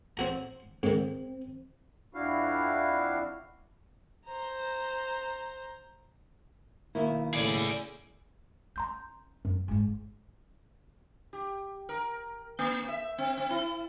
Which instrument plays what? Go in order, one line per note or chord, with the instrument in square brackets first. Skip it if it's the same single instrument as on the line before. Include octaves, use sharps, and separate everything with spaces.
[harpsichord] C4 F#4 A#5
[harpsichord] G#2 D#3 [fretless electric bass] C4
[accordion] F2 D4 E4 F#4 F5
[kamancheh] C5 A#5
[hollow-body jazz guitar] B1 D#3 E4 [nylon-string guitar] A#3
[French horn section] A2 C#3 [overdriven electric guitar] G#4 D5
[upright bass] C#4 [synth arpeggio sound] A#5 C6 G6
[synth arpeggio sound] F#2 [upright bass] C4
[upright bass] G#1 G#2
[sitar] G4
A#4
A#3
E5
C4
C4
E4